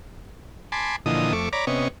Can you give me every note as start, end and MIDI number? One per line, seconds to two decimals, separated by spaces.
0.72 0.96 80
0.72 0.96 81
0.72 0.96 83
0.72 0.96 84
0.72 0.96 86
1.06 1.33 46
1.06 1.33 50
1.06 1.33 52
1.06 1.33 53
1.06 1.33 75
1.06 1.33 87
1.33 1.49 41
1.33 1.49 57
1.33 1.49 85
1.33 1.49 86
1.53 1.65 73
1.53 1.65 74
1.53 1.65 82
1.53 1.65 83
1.53 1.65 86
1.67 1.88 48
1.67 1.88 59
1.67 1.88 61
1.67 1.88 75
1.67 1.88 85